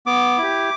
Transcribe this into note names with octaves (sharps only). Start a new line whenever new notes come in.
B3 D6
E4 G4